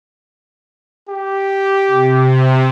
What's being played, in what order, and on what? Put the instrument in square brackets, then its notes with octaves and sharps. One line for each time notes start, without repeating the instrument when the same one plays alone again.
[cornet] G4
[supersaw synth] C3